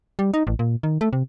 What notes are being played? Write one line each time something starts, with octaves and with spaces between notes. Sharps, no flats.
G3
D#4
A1
A#2
D#3
A3
C3